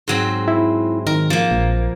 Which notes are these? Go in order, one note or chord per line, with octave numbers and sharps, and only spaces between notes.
G#2 F#3 C4
E4
D#3 A#4
F3 A#3
A#1